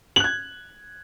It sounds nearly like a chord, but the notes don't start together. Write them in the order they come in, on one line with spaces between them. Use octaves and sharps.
F#7 F#6 G#6